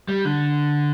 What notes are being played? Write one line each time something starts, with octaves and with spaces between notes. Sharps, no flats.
G3
D3